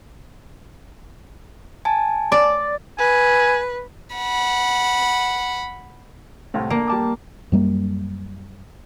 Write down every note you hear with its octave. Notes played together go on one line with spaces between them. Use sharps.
G#5 A5
D5
B4 G#5
F#5 B5
C2 A2
A#3 A5
G3 A5 D6
F#2 G3 A#3